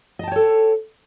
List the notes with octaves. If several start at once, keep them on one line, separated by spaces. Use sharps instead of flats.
A4 C#5 D#5 G5 A5